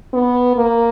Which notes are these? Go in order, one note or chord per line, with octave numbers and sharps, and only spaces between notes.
B3
A#3